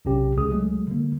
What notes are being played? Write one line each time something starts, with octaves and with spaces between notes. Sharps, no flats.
B1 C3 C#4 G4
C#2 G#4 D#6
F#3 G#3 A3
D3 G3 A#3